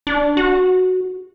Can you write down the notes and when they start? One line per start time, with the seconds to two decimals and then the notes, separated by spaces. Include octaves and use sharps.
0.07 D4
0.37 F#4